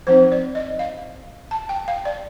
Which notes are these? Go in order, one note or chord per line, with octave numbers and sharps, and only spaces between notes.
F3 C4 D#4 C5
D5
D#5
F5
A5
G5
F5
D5